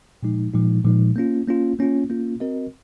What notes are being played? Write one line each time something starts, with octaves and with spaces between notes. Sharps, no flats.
A#2 F3 G#3 D#4
A#2 F3 G#3 D#4
A#2 F3 G#3 D#4
A#3 C#4 F4
A#3 C#4 F4
A#3 C#4 F4
A#3 C#4 F4
C4 F#4 A#4 D#5